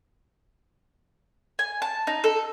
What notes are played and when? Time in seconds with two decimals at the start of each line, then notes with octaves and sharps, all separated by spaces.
1.59 G#5
1.82 A5
2.07 D#4
2.24 A4